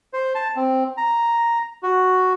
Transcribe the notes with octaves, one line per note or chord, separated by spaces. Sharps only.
C5
A5
C4
A#5
F#4